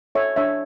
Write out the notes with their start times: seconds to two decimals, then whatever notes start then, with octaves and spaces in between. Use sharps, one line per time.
0.15 A4 C#5 E5
0.36 D4 C#5 E5